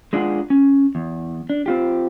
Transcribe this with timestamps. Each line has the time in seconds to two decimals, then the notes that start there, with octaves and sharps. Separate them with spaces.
0.13 G#3 D4 F4 G#4 F#5
0.50 C#4
0.95 E2
1.50 D4
1.66 C4 F4 G4